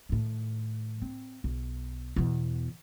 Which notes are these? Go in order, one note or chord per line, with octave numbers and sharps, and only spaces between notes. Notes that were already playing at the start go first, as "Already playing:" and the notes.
A2 D#3
C4
B1
E2 B2